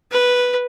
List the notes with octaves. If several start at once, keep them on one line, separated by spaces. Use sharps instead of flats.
B4